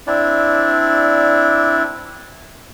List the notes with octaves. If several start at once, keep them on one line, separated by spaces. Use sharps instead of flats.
C4 D4 E4 D5